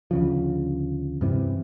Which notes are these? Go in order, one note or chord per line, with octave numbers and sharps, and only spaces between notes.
D2 C#3 F3
G2 C3 E3